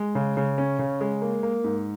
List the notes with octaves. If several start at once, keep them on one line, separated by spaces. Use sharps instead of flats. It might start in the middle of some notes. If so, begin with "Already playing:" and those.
Already playing: G#3
C#3
C#3
C#4
C#3
G#3
A#3
A#3
G#2